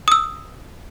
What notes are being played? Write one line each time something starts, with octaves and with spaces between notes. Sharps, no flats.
D#6 E6